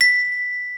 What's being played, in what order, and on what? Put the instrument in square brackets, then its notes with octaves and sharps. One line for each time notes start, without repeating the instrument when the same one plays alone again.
[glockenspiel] B6